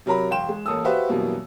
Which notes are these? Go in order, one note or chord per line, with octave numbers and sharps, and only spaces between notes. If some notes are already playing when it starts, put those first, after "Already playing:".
C3 F#3 A#4 A#5 B5
E1 F5 G5 C6 E7
G#3
A1 A#3 A4 D#6 E6
F#4 G4 B4 C5 E5 F5
F#2 B2 E3 G3 A#3